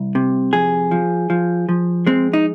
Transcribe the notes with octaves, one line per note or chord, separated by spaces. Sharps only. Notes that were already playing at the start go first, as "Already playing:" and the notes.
Already playing: C2
C3
F2 G#4
F3
F3
F3
G#3 C4
D#4